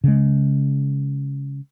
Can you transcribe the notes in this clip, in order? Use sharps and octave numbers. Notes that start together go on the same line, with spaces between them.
C#3 G#3